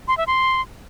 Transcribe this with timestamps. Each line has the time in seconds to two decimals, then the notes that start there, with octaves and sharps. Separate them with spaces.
0.08 C6
0.17 E5
0.27 C6